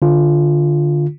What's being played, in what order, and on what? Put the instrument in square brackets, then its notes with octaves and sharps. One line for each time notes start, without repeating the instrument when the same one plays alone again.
[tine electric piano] D3 F4